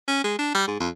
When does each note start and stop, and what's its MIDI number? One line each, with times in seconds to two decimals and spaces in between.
0.08 0.23 61
0.24 0.38 56
0.39 0.54 62
0.55 0.65 55
0.68 0.77 44
0.80 0.89 41